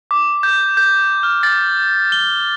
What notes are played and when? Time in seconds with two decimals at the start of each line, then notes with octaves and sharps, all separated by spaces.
0.11 D6
0.43 G6
0.77 G6
1.23 F6
1.43 A6
2.12 G7